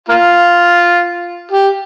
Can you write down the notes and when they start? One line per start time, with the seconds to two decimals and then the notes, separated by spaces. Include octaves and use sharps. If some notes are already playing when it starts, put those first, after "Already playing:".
0.09 A#3 F4
1.52 G4